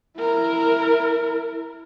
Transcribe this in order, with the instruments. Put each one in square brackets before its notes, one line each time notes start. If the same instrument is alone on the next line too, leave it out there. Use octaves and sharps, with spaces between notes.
[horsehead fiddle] E4 A#4